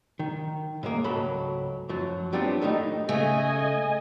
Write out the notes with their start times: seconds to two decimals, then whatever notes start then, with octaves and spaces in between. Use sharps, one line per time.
0.19 D#3
0.83 A2 G#3 A#3
1.04 C#2 G#2 F#3 A4 B5
1.89 F#2 F3 F#3
2.33 F#3 G3 B3 C4 D4 F4
2.61 F2 A2 D#3 A3 D4 D#4
3.09 C#3 A3 D#5 G#5